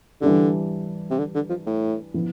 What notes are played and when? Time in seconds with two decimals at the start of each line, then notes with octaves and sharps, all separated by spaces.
0.21 D3 E3 G3 D4 G4
1.11 C3
1.19 D3
1.35 D3
1.50 F3
1.66 A2
2.14 F3 B3 E4